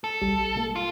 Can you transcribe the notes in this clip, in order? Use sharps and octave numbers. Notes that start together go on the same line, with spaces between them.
A4
A#1 G3 G4
B2 G#3 A#3
F4